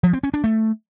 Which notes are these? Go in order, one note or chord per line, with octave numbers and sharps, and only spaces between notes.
F3
C4
C#4
D4
A3